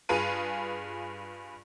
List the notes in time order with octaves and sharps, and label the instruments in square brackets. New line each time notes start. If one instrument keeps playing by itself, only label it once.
[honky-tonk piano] G2 F4 G#4 B4 D#7